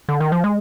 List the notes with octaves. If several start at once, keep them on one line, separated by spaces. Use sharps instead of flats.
D3
D#3
F3
G#3